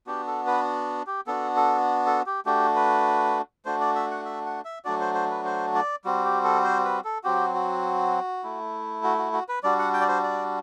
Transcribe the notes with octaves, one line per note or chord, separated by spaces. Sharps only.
B3 D4 F#4 G4
A4
B4
G4
B3 D4 F#4 A4
A4
A4
G4
A3 D4 F#4 G4
B4
A3 D4 F#4 C5
D5
E5
F#5
E5
F#5
E5
F#3 A3 D4 F#4 D5
C5
C5
B4
C5
D5
G3 C4 F#4
G4
A4
C5
B4
A4
F#3 C4 F#4 G4
F#4
A3 E4
F#4
F#4
F#4
B4
G3 D4 F#4 D5
F#5
G5
D5
C5
D5